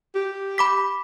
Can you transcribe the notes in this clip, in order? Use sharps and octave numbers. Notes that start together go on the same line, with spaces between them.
G4
B5 D6 B6